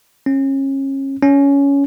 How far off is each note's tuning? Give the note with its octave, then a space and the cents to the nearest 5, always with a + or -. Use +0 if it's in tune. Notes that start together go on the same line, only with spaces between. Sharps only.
C#4 -30
C#4 +15